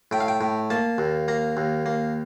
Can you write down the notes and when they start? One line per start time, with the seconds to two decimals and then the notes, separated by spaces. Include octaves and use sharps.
0.11 A2 G5
0.21 F5
0.28 G5
0.41 A2
0.70 A#3 A5
0.98 D#2
1.28 A#3 A#5
1.57 D#2
1.86 A#3